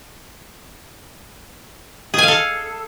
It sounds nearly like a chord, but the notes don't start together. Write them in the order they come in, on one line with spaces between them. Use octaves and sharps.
G#4 G#5 F5 A4